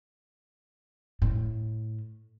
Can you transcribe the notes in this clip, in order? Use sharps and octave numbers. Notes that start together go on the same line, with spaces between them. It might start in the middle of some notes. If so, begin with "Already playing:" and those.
A2